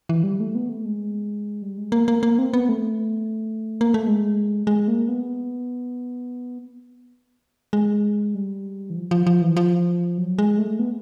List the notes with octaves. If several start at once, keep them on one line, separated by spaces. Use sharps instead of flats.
E3
G3
A3
B3
A3
G#3
G3
G#3
A#3
A#3
A#3
C4
B3
A3
A#3
A3
G#3
G#3
A#3
B3
G#3
G3
E3
F3
F3
F3
E3
F3
F#3
G#3
A3
B3